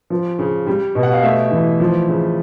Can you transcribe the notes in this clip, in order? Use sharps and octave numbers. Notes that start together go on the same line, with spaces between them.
F3
C#3
G3
B2
F#5
F5
A3 E5
E3
F3
C#3